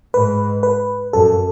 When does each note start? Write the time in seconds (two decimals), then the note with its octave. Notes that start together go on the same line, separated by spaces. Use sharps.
0.14 G#2 B4
0.63 B4
1.13 F#2 A4